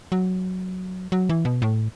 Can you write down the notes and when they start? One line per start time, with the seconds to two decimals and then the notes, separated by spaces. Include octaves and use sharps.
0.12 F#3
1.12 F#3
1.29 E3
1.45 B2
1.62 A2